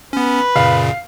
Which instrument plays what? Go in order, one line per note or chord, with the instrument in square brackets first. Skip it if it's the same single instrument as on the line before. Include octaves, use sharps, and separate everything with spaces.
[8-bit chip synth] B3 C#4 [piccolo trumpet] B4
[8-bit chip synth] F#2 A#2 C#3 [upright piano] F5